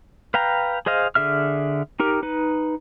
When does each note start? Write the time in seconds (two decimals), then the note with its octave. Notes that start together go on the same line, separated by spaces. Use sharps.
0.34 B4 F5 G5 A#5
0.86 G#4 C5 D#5 F5
1.15 D3 G#4 E5 F6
2.00 D#4 G4 A#4
2.23 D#4 B4